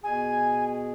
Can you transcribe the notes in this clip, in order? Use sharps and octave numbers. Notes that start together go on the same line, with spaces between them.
B2 G#4 G#5